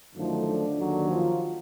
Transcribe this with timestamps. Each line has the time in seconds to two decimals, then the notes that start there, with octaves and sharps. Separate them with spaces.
0.16 F#2 D3 D#3 F3 A3 D#4
0.47 D3 D4
0.78 D#2 D#3 F#3
1.09 F3 F4